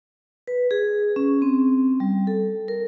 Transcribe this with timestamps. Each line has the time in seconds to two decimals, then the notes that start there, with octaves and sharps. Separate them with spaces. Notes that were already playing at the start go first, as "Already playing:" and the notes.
0.48 B4
0.71 G#4
1.16 C#4
1.42 C4
2.00 G3
2.27 A4
2.68 A#4